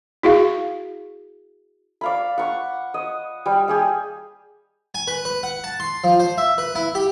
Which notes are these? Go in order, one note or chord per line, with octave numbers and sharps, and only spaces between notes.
E4 F#4 G#4 F5
D5 F5 B5
F#5 C#6
D#5
G3
G4 G#4 G5
G#5
B4
B4
F#5
A5
C6
F3
C5
E5
B4
E4
G4